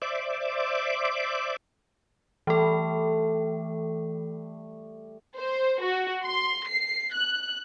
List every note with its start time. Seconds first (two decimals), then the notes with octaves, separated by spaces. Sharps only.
0.02 C5 D5 E5 D6
2.47 E3 G3 A3 A4
5.37 C5
5.82 F#4
6.25 C6
6.68 C7
7.14 F#6